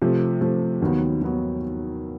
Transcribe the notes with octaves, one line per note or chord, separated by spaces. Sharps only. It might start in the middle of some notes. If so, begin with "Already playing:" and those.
C3 F3 A3
C3 F3 A3
D#2 D#3 F#3 B3
D#2 D#3 F#3 B3